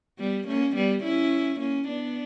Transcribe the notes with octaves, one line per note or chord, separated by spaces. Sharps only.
G3 B3
A#3 C#4
G3 B3
C#4 E4
A#3 C#4
B3 D4